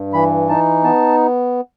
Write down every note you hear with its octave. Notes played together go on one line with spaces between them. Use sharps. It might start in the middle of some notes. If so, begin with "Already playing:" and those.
Already playing: G2
E3 B5
D#4 A5
B3 A5